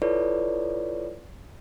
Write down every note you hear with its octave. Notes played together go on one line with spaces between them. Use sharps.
E4 F4 A4 B4 C#5 D5